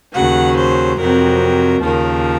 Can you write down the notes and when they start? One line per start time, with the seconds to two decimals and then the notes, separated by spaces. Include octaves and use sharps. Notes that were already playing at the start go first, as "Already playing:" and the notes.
0.15 D#2 C#3 F#3 F#5
0.57 C5
0.99 F2 C3 F#3 A#4
1.83 D#2 C#3 F3 A#4